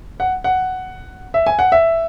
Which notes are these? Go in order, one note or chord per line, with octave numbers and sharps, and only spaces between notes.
F#5
F#5
E5
G#5
F#5
E5